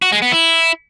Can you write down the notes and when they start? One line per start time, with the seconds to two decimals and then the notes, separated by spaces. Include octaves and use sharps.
0.02 F#4
0.12 G#3
0.22 B3
0.32 E4